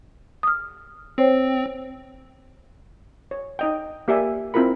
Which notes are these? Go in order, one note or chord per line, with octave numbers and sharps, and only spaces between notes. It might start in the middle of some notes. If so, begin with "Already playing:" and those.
D#6 F6
C4 C5 C#5 G5
C#5
D#4 D#5 G5
A#3 G4 D5 E5 G#5
C4 E4 F4 A#4 B5